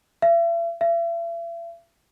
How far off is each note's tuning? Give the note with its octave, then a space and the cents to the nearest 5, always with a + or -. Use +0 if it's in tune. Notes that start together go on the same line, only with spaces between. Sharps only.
E5 +40
E5 +40